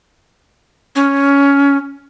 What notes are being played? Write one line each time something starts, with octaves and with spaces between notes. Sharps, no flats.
C#4